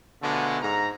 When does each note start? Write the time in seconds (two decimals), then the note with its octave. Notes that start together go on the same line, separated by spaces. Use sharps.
0.22 B2 D3 F3 G#3 A3
0.62 G#2 A#5